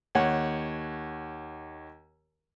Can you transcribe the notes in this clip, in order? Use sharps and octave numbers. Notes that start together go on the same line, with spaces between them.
D#2 C#5 F#5